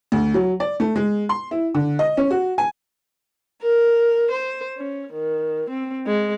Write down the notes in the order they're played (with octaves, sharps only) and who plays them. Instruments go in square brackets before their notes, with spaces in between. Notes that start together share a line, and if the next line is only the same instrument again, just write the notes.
[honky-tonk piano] D2
F#3
D5
A3
G#3
C6
E4
D3
D#5
C#4
F#4
G#5
[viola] A#4
C5
C#4
D#3
C4
G#3